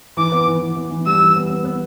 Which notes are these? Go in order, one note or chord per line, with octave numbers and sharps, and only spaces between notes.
E3 D6
B3
E3
E3
B3
E3
G3 E6
E3
B3
B3
B3